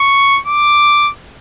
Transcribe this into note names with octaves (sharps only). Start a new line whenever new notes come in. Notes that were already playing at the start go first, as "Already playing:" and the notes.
Already playing: C#6
D6